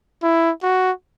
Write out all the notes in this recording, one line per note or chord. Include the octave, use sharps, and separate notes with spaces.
E4
F#4